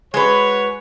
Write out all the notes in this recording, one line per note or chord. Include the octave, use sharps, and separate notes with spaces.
G#3 F#4 B4 C#5